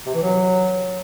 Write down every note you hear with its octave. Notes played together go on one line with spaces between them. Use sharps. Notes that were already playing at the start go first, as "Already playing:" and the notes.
C3
E3
F#3